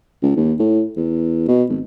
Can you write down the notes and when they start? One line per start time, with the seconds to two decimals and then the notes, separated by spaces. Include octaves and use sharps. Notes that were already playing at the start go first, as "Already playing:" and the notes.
0.23 C#2
0.37 D#2
0.59 A2
0.97 E2
1.48 B2
1.69 G#1